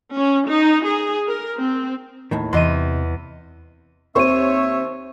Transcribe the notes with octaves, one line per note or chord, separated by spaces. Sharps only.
C#4
D#4
G#4
A#4
C4
D#2 A2 D#3
E2 C3 D#5 C6 D#7
D#2 C4 C5 C#5 E5 C#6 D#7